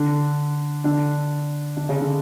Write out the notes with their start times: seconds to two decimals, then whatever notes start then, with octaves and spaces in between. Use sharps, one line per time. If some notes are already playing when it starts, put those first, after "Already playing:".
Already playing: D3 D4
0.84 D3 D4
1.77 D3 D4
1.89 C#3 C#4
2.01 D3 D4